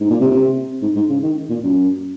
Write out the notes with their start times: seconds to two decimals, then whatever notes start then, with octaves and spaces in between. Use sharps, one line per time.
0.01 G#2
0.10 A#2
0.21 C3
0.31 C3
0.82 G#2
0.95 G#2
1.09 C#3
1.23 D#3
1.50 A#2
1.64 F#2